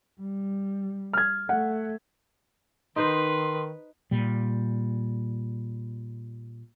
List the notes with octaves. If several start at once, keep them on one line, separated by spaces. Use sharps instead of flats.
G3
F6 G#6
A3 F#5
D#3 D#4 B4 C5 D#5 C6
A#2 G3